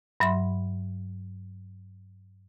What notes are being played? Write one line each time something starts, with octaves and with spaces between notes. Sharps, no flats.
G2 F#3 E5 B5 C6